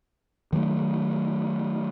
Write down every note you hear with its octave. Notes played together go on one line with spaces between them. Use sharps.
D#3 F#3 G3 A3